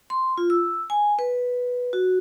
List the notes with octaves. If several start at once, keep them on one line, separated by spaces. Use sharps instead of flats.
C6
F4
E6
G#5
B4
F#4